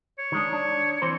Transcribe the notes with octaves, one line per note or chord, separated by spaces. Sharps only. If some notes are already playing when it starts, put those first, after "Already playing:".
C#5
D#3 G#3 D4
D4
E3 C4 C5